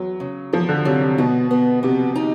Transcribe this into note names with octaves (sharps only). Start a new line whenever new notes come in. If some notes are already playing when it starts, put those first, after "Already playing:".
Already playing: E2 F#3
C#3
E2 F3
D3
C3 F#3
C3
B2 B3
B3
C3 B3
D#4